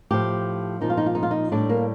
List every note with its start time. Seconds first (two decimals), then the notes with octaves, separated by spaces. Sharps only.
0.10 A2 F3 G4
0.81 A#2 F3 D#4
0.90 F4
0.97 D#4
1.06 F4
1.15 D#4
1.23 F4
1.31 D#4
1.52 A2 G3 D4
1.69 A#3